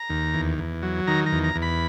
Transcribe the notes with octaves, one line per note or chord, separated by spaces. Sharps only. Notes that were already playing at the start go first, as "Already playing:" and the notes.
Already playing: A#5
D#2
E2
E2
F#3
D#3 A#5
A#5
E2
A#5
E2
B5